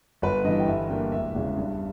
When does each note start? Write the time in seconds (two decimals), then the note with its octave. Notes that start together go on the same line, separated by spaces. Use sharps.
0.22 G1 B4
0.44 G2 E3 D#5
0.60 G5
0.67 G1 E5
0.89 G2 G3 A#3 G5
1.12 E1 E5
1.35 E2 C#3 G#3
1.57 G2